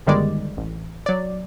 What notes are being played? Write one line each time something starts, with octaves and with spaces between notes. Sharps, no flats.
G1 D#3 G3 G#3 D5
A1
F#3 D5